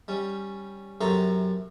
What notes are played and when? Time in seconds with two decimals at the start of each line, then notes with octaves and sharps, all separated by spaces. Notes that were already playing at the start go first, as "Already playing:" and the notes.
0.08 G3 C#4
1.01 F#2 C3 A4 C#5 A#5 C6